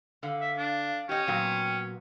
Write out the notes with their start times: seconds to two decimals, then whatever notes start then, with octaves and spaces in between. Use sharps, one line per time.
0.23 D3 F5
0.41 E5
0.57 D4
1.09 C#4 G4 D#5
1.27 A#2 F#3 B3 G5